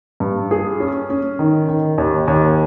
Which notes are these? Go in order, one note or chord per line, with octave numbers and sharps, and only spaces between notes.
G2
G#4
C#4
C#4
D#3
D#3
D#2
D#2